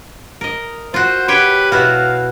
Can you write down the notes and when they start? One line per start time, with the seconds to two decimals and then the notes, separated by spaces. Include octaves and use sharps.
0.41 A#4 D#5
0.94 F4 F#4 C5
1.28 G4 B4 C#5 G5
1.72 B2 E4 F#4 F5